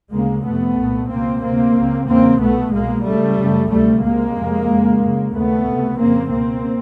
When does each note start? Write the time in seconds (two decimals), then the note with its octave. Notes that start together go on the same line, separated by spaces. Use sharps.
0.13 D2 C#3 G#3 A#3
0.45 F2 C3 A3 B3
0.78 C2 A#2
1.10 C#2 B2 A#3 C4
1.43 D2 C3 A#3 C4
1.76 C#2 C#3
2.08 E2 C#3 A#3 C4
2.41 C2 B2 A3 B3
2.74 C2 B2 G#3 A#3
3.06 C#2 C#3 G3 A3
3.38 F#2 C#3
3.71 D2 C3 G3 A3
4.04 C#2 C3 G#3 A#3
4.36 F2 C3
4.69 F2 C#3
5.01 F#2 C#3
5.34 D#2 C#3 A3 B3
5.67 C#2 C3
5.99 F2 C#3 A#3 C4
6.32 C#2 B2 A#3 C4